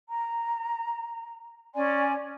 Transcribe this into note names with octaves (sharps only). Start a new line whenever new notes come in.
A#5
C#4 D5 G#5 C6